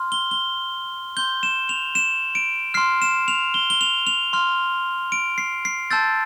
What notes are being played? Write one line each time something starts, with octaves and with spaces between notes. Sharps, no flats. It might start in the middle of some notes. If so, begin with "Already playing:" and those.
Already playing: C6 F6
G7
G7
C6 G6 G7
E7
F7
E7
D7
C6 F6 C7
E7
F7
G7
G7
F7
F7
C6 F6
D7
C7
C7
A5 C6 E6 G6 A6